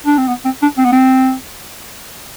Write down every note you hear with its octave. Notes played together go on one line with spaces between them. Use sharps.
D4
C4
B3
C4
D4
C4
B3
C4